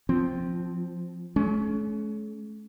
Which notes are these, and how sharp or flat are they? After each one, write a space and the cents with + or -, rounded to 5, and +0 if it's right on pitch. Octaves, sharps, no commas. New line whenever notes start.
F3 +0 C4 +0
A3 -45 C#4 +15